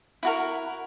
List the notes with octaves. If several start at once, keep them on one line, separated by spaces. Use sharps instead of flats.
E4 F#4 A#4